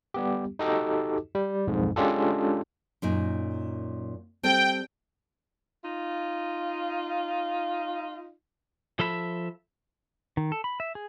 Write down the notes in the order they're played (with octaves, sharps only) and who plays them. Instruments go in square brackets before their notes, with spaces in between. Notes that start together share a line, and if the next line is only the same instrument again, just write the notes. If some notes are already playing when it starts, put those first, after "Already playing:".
[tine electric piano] G3 B3 G4
D#4 F#4 G4 A4 D#5 D6
G3
B1 F2 G#2
G#3 C#4 D4 F4 G4 A4
[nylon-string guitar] F#2 A#2 D#4
[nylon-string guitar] G3 C4 A4 [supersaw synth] G5
[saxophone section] D#4 F4
[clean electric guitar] F3 A4 E5 B5
[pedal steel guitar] D#3
A4
B5
E5
G#4